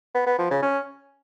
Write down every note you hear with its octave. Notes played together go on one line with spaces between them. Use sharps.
B3
B3
F3
C#3
C#4